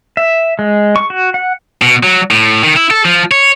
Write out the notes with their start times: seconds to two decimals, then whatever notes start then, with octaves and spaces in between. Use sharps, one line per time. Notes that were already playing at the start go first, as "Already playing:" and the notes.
0.17 E5
0.59 G#3
0.96 C#6
1.10 F#4
1.34 F#5
1.82 B2
2.03 F#3
2.31 A2
2.63 D#3
2.76 E4
2.91 A4
3.05 F3
3.31 C#5